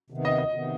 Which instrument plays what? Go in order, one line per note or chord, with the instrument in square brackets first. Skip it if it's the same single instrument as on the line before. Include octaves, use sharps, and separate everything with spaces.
[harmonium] C3 D#3 B3
[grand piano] D#5
D#5
[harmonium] C3 D#3 B3